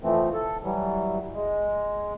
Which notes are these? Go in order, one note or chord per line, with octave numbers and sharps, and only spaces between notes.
F2 E3 F3 A3 C4
A4
E3 F#3 G3
G#3